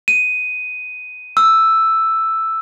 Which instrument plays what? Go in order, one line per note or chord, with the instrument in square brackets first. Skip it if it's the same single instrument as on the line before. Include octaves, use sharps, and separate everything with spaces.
[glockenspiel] D#7
E6